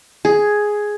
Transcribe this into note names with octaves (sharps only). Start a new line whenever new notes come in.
G#4